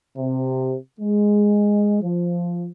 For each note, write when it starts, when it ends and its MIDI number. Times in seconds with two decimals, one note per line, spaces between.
0.17 0.75 48
0.99 2.01 56
2.02 2.67 53